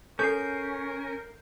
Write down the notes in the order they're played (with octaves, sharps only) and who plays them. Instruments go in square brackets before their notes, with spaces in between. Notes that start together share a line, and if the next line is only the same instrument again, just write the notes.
[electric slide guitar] C#4 [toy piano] A4 [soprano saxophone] A#4 [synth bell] G6 C7